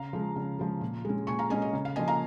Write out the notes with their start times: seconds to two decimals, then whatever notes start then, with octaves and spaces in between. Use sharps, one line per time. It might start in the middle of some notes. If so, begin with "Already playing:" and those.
Already playing: C#3 F5 A#5
0.13 F3 G#3
0.36 C#3
0.59 F3 G#3
0.81 A#2
1.05 G#3 C#4
1.27 A#2 G#5 C#6
1.39 F5 A#5
1.50 G#3 C#4 D#5 G#5
1.62 D#5
1.73 C#3
1.85 F5
1.96 F3 A#3 D#5 G#5
2.08 F5 A#5